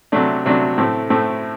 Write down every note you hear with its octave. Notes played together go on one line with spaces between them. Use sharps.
C3 F#3 A3 D4
C3 F#3 A3 D4
A2 A3 C4
A2 A3 C4